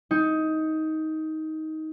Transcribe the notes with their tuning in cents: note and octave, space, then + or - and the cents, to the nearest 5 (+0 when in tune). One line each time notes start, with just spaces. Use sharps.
D#4 +15